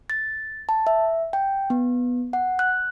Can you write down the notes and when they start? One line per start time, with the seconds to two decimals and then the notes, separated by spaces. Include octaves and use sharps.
0.10 A6
0.69 A5
0.87 E5
1.33 G5
1.70 B3
2.33 F#5
2.59 F#6